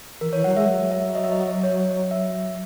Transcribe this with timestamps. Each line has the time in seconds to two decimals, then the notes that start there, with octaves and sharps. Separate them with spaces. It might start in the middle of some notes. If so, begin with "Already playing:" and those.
0.21 E3 A#4
0.32 E3 C#5
0.44 F#3 F#5
0.56 G#3 E5
0.68 F#3 E5
0.92 E5
1.15 D#5
1.24 E5
1.32 D#5
1.63 C#5
2.11 E5